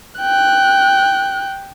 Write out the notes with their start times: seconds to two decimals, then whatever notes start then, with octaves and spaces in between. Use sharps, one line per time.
0.19 G5 F#6